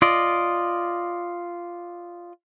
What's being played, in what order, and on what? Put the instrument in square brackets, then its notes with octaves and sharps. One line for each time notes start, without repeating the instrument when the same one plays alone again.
[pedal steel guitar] F4 D5 D#5